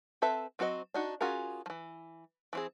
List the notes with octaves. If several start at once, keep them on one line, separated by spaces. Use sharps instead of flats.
C4 A4 B4 E5
F#3 C4 F#4 A#4 D#5
D4 D#4 F#4
C#4 F4 F#4 G#4 A#4
E3 F3
E3 C4 G#4